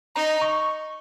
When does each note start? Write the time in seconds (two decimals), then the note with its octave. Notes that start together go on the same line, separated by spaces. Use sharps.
0.15 D#4 A#5
0.42 C#6